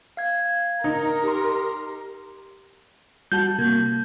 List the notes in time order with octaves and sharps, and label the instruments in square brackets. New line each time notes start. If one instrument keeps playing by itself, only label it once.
[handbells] F5 G#6
[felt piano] D#4 [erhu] A#4 [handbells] A#5
[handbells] G4 C6
[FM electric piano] G3 F#4 A5 [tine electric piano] G6
[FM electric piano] C3 A#3 G#6